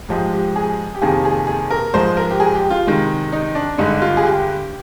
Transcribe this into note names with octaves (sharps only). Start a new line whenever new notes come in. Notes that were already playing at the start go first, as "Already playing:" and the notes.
G#2 F3 G#3 G4
G4
G#4
G4
F2 C3 D#3 A#3 G#4
G#4
G#4
A#4
G#2 F3 G#3 C5
A#4
G4
G#4
G4
F4
C3 D#3 G#3
D#4
D4
G2 D3 G#3 D#4
F4
G#4
G4